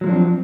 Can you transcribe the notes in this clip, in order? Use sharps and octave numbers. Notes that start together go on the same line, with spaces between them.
F3 F#3 G#3 C4 D4